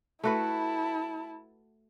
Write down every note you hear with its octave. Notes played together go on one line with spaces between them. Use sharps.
A3 E4 F#4 B4 A5